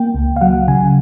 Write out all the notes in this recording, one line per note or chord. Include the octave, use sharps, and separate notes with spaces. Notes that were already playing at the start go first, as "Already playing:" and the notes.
Already playing: A#3 G5
C#2
F5
F#3 F#5
C#3 G#5